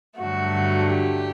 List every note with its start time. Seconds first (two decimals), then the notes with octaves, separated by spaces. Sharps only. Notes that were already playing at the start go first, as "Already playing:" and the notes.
0.18 G2 D3 F#3 A3 F#4
0.92 G4